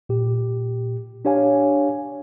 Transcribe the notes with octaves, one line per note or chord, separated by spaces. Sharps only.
A#2 G4
D4 G4 C#5 F5 G#5